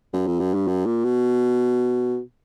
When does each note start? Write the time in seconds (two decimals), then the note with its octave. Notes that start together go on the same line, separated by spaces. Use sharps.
0.13 F#2
0.27 F2
0.40 F#2
0.54 G2
0.68 F#2
0.86 A#2
1.04 B2